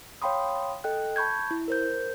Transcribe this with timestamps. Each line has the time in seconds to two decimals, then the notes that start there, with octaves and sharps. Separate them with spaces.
0.22 C#5 F5 G5 B5 C6 D#6
0.84 A4 D#5 G5 F#6
1.16 A5 B5 C#6 G6 G#6
1.51 E4
1.68 A#4 C5 G6